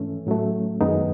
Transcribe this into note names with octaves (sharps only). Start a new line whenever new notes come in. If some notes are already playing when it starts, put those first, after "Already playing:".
Already playing: G#2 E3 A3 C#4
A2 F#3 A3
F#2 D#3 G#3 B3 D#4